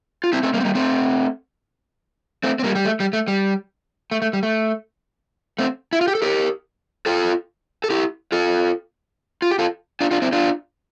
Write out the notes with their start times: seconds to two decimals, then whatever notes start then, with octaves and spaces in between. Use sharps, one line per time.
0.24 F4
0.33 C4 E4
0.43 A3 C4
0.54 G3 A#3
0.60 C4
0.65 G3 A#3
0.75 A3 C4
2.43 A3 C4
2.59 C4
2.64 G3 A#3
2.75 G3
2.85 A3
3.00 G3
3.13 A3
3.28 G3
4.11 A3
4.22 A3
4.33 G3
4.43 A3
5.59 A3 C4
5.93 E4
6.01 F4
6.08 G4
6.15 A4
6.22 G4 A#4
7.06 F4 A4
7.84 A4
7.90 E4 G4
8.32 F4 A4
9.42 F4
9.51 G4
9.59 F4 A4
10.01 D4 F4
10.11 D4 F4
10.22 C4 E4
10.32 D4 F4